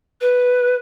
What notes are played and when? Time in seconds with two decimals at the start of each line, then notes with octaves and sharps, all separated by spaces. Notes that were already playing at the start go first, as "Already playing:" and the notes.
0.21 B4